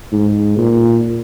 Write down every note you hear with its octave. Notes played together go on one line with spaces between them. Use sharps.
G#2
A#2